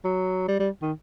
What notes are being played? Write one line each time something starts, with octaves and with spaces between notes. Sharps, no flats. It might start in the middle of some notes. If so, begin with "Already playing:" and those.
F#3
G3
G3
D#3